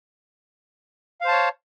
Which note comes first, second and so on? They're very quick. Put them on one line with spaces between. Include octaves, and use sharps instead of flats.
F5 C5 A5 C#5